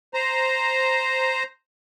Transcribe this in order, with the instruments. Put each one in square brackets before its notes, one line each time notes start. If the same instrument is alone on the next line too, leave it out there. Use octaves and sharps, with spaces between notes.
[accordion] C5 A#5